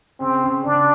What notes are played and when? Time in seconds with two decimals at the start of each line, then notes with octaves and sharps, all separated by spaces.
0.20 C#3 C4
0.43 C#3
0.65 C#3 D4